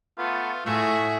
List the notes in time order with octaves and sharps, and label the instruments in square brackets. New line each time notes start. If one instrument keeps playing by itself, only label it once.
[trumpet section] A3 B3 [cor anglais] F4
[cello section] A2 [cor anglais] A3 [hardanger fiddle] F#4 G#4 [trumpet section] E5